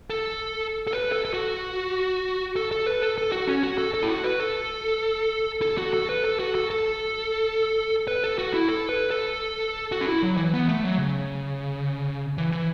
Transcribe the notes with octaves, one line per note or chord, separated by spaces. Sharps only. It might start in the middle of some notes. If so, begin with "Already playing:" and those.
A4
A4
B4
A4
A4
F#4
A4
A4
B4
A4
A4
F#4
C#4
F#4
A4
A4
E4
F#4
B4
A4
A4
F#4
A4
B4
A4
F#4
A4
A4
B4
A4
F#4
E4
A4
B4
A4
F#4
C#4
E4
F#3
E3
B3
A3
F#3
C#3
E3
E3